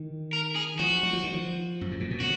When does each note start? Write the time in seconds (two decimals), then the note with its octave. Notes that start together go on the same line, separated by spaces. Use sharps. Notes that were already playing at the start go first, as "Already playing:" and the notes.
Already playing: D#3
0.33 A#4
0.56 G#4
0.79 F3 F#4
1.03 F#3
1.13 F3
1.24 D#3
1.34 F3
1.81 F#2
1.91 G#2
2.00 A#2
2.11 B2
2.20 C#3 F#4